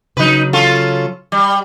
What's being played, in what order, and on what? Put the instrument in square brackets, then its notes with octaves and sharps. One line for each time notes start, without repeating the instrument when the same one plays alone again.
[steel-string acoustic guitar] C#3 F#3 [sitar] D#4 B4
[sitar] C#4 F4 A4
G3